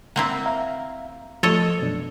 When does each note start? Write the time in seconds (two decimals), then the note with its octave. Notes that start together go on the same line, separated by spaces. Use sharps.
0.16 A#3 C4 E4 F#5 A#5
0.46 E5 F5 A#5
1.43 F3 A3 A4 C#5 D#5
1.79 F#2 B2 D4